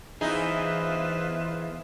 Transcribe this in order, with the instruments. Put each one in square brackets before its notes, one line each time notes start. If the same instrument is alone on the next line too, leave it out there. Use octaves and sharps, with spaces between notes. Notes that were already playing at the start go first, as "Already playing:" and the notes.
[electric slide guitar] E2 G#4 [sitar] E3 D#4 [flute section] F4 E5 [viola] B4 C5